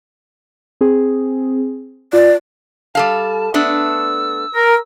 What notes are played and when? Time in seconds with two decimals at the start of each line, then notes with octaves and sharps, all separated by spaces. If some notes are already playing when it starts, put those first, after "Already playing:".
0.81 C4 G#4
2.13 F4 D5
2.95 G3 A4 F5 A5
3.54 A3 B3 D4 E6
4.55 A#4